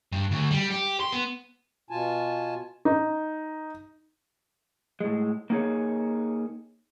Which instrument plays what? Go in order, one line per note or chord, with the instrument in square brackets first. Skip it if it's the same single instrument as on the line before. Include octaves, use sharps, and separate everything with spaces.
[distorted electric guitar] G2
D2
G3
G4
C6
B3
[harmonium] B2 F4 G#5 A5
[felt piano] D#4
[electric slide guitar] A2 G#3
A#3 D#4 G#4 C#5